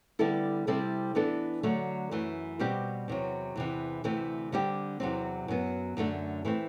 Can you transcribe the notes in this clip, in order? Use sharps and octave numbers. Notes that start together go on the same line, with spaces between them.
D3 G3 B3 E4 A4
C3 G3 C4 E4 A4
E3 B3 D4 A4
D3 F#3 A3
F#2 E3 A3
B2 G3 C4 G4
E2 C3 F#3
E2 C3 E3
D2 C3 E3 A3 C4
D3 G3 C4 G4
E2 C3 F#3 C4
F#2 F#3 B3
F#2 D3 A3 D4
E3 A3 C4